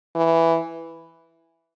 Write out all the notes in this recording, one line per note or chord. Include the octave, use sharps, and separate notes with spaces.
E3